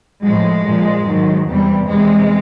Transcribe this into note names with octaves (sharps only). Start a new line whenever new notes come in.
A2 F3 G#3
A#2 F3
G#2 D#3 F#3
E2 C3 E3 G3
E2 C3 E3 G#3